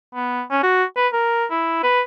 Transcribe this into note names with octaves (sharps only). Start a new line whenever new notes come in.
B3
C#4
F#4
B4
A#4
E4
B4